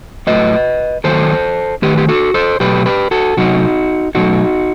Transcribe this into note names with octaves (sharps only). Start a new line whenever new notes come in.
A2 F#3 A3 B4 D#5
D#3 F#3 A3 A4 C5
D#3 A3 G4 B4
G4
F#4 A4
A4 C5
B2 F#3 A3 G4 B4
G4 B4
F#4 A4
C3 F#3 A3 D#4 F#4
B2 F#3 A3 D#4 F#4